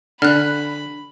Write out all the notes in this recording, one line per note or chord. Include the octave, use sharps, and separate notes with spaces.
D3 D4 B5 F6 F#6